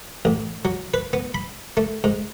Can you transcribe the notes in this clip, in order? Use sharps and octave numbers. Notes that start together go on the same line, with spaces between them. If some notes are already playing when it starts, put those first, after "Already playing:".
A1
F#3
B4
B3
B5
A3
G#2